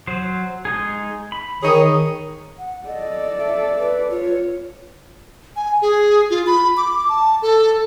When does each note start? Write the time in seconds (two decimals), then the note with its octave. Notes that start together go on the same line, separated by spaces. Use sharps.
0.07 F#3 C5
0.65 G#3 D#4 G#4
1.32 B5
1.62 D#3 D#4 G#4 C#5
2.58 F#5
2.87 A4 D5 D#5
3.38 E5
3.79 B4
4.11 F4 C#5
5.56 G#5
5.82 G#4
6.30 F4
6.47 B5
6.77 D6
7.09 A5
7.42 A4